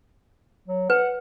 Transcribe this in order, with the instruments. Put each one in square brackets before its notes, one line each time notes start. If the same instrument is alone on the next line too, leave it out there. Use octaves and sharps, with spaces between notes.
[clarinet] F#3
[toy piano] B4 [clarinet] F#5